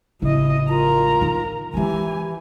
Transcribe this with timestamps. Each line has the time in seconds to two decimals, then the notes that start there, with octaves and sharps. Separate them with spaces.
0.22 A1 C#3 E4 D#5
0.69 F4 A#4 A#5
1.21 D#3 D#4
1.74 D#3 E3 G#3 G4 G#5